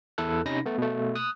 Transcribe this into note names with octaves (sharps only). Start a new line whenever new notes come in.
E2 E4 A4 F#6
C3 C#4 D#4 B5 A#6
A3 B3
B2 A3
D#6 F#6